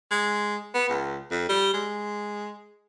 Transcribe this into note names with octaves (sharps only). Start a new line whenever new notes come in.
G#3
B3
C#2
F2
G3
G#3